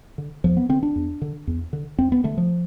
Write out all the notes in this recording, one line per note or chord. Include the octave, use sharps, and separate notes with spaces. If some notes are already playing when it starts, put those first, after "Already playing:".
D3
E2 F3
B3
D3 C4
D4
E2
D3
E2
D3
E2 C4
B3
D3 A3
F3